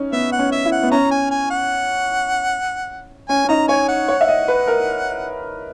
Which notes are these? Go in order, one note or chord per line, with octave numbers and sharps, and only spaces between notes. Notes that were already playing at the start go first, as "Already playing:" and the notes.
Already playing: C#4 D#4
B3 E5
F#5
C#4
E5
E4
F#5
B3
C#4 A#5
G#5
G#5
F#5
C#4 G#5
C#4
D#4 A#5
C#5 G#5
F#5
C#5
E5
D#5
B4
A#4